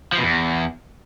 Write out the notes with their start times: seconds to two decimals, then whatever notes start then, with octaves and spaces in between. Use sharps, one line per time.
0.12 F3
0.18 B2
0.23 E2